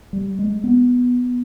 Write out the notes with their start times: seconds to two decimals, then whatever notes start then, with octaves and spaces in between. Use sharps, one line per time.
0.13 G3
0.39 G#3
0.64 B3